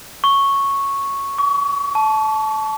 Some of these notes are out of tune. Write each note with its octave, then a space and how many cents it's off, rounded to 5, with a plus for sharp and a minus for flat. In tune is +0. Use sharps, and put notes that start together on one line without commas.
C#6 -5
C#6 +40
A5 -20